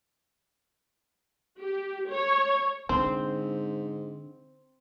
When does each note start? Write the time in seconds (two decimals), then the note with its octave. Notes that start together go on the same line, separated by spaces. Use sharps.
1.58 G4
2.08 C#5
2.89 G#2 D3 C4 C5